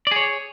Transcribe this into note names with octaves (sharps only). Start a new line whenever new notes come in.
G#4 C#5 D5